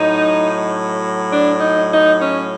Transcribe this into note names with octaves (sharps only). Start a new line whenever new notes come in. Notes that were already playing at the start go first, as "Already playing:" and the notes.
Already playing: A2 F#3 D#4
D4
D#4
D#4
C#4